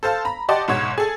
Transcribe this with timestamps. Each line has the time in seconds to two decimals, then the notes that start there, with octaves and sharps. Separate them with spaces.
0.03 A4 C5 F5 A5
0.25 A#5 B5
0.49 G4 D5 D#5 F#5 A5 C6
0.68 F#1 G#2 B2 C#5 F#5 G#6
0.98 G#4 A4